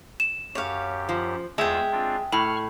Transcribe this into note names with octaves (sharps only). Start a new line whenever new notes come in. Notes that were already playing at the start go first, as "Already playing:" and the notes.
E7
F#2 G4 C#5 F5
F3
E2 G#3 F4 E5 G5 E6
C4 D4 F4
A2 B5 C#6 F6